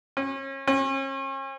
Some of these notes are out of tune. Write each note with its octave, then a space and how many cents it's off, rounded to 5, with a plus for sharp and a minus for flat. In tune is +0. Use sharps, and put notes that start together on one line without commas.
C#4 -35
C#4 -40